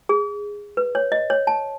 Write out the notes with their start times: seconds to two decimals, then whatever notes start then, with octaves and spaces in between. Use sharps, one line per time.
0.09 G#4
0.77 B4
0.95 C#5
1.12 D#5
1.30 C#5
1.47 A5